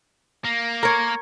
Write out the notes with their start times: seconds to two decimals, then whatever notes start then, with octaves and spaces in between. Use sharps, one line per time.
0.44 A#3
0.83 A#4 C#5